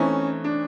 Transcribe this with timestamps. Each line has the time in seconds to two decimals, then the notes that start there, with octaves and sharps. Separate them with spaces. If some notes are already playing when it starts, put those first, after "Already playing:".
Already playing: E3 A3 C4 C#4 D#4
0.44 D4